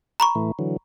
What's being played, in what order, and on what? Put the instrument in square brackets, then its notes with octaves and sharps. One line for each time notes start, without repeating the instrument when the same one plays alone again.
[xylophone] A#5 B5 C#6
[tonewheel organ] A2 E3 A3
D3 E3 F#3